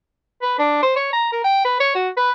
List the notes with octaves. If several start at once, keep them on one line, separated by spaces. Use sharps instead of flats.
B4
D4
C5
C#5
A#5
A#4
G5
B4
C#5
F#4
B4